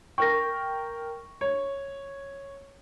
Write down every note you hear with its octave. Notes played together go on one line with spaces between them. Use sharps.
A#4 G5 C#6 A#6
C#5